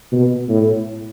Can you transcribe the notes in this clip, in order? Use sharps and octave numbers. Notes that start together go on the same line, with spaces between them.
B2
A2